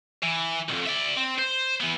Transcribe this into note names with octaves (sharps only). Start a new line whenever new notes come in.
E3
B1 F2
D5 E5
C4
C5
E3 B3